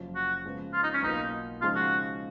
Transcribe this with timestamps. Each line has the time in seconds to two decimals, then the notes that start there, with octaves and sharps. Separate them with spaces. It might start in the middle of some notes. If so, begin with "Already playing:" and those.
Already playing: F#1 F#2 F3
0.15 F#4
0.44 C#3 F3 G#3 B3
0.73 F4
0.83 D#4
0.93 C#4
1.02 B1 B2 A#3 D#4 F4 B4
1.62 C#3 F3 G#3 D#4 F4
1.76 F#4